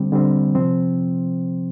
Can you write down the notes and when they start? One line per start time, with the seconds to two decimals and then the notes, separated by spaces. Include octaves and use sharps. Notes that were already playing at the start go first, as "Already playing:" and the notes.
Already playing: D3 G3 C4
0.12 D3 G3 C4
0.55 C3 F3 C4